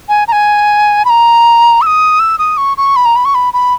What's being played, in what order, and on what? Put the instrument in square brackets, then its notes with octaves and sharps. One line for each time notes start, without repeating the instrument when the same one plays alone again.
[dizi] G#5
A#5
G#5
B5
A#5
E6
D#6
E6
D#6
C#6
C#6
B5
A#5
B5
C#6
B5
B5